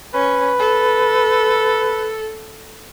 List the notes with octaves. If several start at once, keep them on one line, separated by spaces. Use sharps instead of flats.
C#4 B4
A4